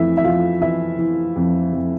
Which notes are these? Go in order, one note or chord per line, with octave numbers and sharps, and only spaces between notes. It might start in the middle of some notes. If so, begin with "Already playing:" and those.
Already playing: F2 E3 A3 E4 E5
E5
F2 F4 F5
E3 E4 E5
E3
F2
F2